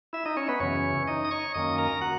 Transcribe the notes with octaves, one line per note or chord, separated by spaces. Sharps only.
E4 E5
D#4 D#5
C#4 C#5
B3 B4
F#2 C#3 E3 C#4 C#5
D#4 D#5
D#6
C#5 C#6
F#2 D#3 A#3 C#4 D#5 D#6
A#4 A#5
F#4 F#5